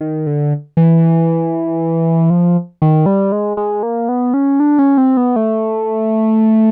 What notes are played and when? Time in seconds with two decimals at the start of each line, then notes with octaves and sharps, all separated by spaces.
0.01 D#3
0.27 D3
0.77 E3
2.30 F3
2.82 D#3
3.06 G3
3.32 G#3
3.57 G#3
3.83 A#3
4.09 B3
4.34 C#4
4.60 D4
4.79 C#4
4.98 C4
5.17 B3
5.36 A3